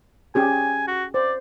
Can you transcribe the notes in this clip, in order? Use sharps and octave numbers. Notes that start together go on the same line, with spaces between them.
C#4 G4 G#4 G#5
F#4
C5 D5